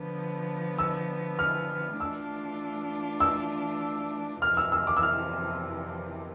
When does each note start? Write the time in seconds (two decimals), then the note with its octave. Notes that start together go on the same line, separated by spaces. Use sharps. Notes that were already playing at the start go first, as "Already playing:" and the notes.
Already playing: D3 F3 B3
0.79 E6
1.39 F6
1.99 E3 A3 D4 F4 E6
3.20 E6
4.42 F2 C3 E3 F6
4.57 E6
4.72 E6
4.87 D6
4.97 E6
5.03 F6